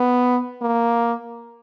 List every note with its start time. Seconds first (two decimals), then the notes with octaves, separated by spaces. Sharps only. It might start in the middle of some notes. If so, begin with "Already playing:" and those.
Already playing: B3
0.62 A#3